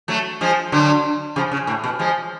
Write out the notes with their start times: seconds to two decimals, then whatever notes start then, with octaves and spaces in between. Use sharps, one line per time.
0.08 F#3 A3
0.41 F3 G#3
0.72 D3 F#3
1.36 C#3 F3
1.52 C#3
1.67 A2
1.84 B2
1.99 F3 G#3